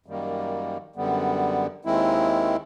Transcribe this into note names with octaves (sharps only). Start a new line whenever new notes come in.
F#2 D#3 G3 A#3
F#2 D3 G3 B3
D#2 D#3 G#3 C4 E4